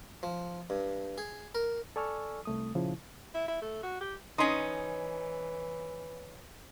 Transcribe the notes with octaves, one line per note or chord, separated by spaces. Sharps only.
F3
G2
G#4
A#4
A4 D5 G#5 C#6 E6 F6
C2 A3 D#6
A#2 C#3 F3 E4
E4
E4
A3
F#4
G4
E3 C#4 D#4 D#5 C6 D#6